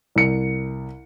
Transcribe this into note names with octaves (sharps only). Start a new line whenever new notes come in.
C2 C#7